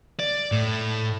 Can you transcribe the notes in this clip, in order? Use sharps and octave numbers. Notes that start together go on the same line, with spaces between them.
D5
A2